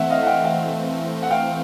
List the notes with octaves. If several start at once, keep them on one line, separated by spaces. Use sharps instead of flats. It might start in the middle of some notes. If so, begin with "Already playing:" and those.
Already playing: E3 A3 C4 E5 F#5
D#5 F5
F#5
F5 G5
F5 G5
F#5
F5 G5